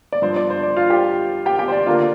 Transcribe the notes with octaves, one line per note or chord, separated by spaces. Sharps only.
D5
G2 F3 D4 C5
D5
C5
D5
F4 F5
G4 G5
G4 G5
G4 G5
C5
D5
D3 A#3 D4 F4 F5